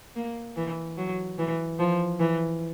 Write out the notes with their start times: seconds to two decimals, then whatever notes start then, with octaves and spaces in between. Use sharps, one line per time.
0.16 A#3
0.56 E3
0.98 F#3
1.38 E3
1.79 F3
2.20 E3